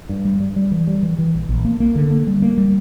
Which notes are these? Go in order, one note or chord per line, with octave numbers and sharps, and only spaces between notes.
G2
G3
G3
G3
E3
G3
E3
E3
A#1
A#1
A#3
A#3
D3
A#3
G3
A#3
G3